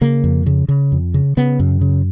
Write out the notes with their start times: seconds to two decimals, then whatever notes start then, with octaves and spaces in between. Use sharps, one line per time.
0.01 C#3 A#3
0.24 F2
0.46 C#3
0.68 C#3
0.92 F2
1.14 C#3
1.37 C#3 B3
1.60 F#2
1.81 C#3